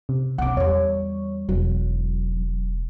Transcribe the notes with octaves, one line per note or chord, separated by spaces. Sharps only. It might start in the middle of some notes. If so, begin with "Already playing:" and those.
C3
B1 C#4 F#5 D6
E2 G3 C#5
E1 F#3